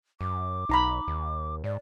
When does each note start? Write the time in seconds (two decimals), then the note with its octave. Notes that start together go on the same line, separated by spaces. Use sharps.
0.21 F#2 D6
0.69 B1 D#4 A#5 B5
1.08 D#2
1.64 G#2 D5